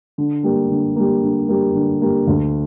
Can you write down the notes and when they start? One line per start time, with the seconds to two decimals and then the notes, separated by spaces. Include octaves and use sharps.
0.18 D3
0.43 G3 A#3
0.70 D3
0.96 G3 A#3
1.23 D3
1.48 G3 A#3
1.75 D3
2.02 G3 A#3
2.27 D2